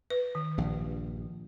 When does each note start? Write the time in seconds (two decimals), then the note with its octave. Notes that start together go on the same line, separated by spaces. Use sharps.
0.10 B4
0.35 D#3
0.58 A#1 G2